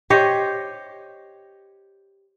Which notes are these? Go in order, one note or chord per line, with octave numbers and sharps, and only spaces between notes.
G4 C5 C#5 D#5